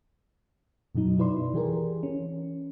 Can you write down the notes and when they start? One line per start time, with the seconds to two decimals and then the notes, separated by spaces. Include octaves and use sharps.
0.95 F#2 B2 F#3 D#4
1.19 E4 B4 D5 C6
1.54 E3 G4 G#4 A#4
2.03 C#4